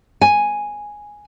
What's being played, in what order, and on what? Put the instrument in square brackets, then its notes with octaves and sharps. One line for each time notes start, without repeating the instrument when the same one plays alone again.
[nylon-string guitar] G#5